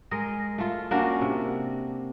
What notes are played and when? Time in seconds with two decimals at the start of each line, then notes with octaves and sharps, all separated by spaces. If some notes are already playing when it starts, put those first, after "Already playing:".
0.11 G#3 A#4 D#5
0.58 A3 F4
0.91 A#3 C#4 D4 F#4
1.21 C3